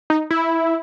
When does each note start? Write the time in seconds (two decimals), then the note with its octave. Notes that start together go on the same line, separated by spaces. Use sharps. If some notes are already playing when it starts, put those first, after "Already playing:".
0.10 D#4
0.30 E4